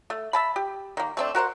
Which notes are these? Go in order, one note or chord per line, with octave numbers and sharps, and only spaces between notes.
A3
E5 A5 B5
G4
D#3 A#3
A3 C4 D4
F#4 A#4 C5 F#5